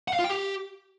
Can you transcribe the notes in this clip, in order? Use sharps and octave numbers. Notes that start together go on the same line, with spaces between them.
F#5
F5
F4
G5
G4